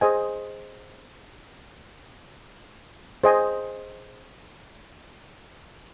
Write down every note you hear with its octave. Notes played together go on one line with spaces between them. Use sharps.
G#4 C5 D#5 G#5
G#4 C5 D#5 G#5